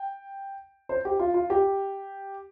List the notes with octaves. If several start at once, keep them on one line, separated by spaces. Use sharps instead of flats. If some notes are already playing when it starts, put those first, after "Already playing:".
Already playing: G5
C5
G4
F4
F4
G4